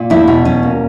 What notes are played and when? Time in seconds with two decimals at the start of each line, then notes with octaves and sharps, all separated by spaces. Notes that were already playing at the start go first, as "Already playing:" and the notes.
Already playing: A#2
0.10 E2 E4
0.28 B2
0.45 E2 C#4
0.63 A#3